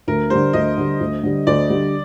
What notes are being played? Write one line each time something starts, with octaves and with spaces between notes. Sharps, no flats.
D2 A#4
D3 G3 C5
D2 D#5
D3 G3
D2
D3 G3
D2 D5
D3 G3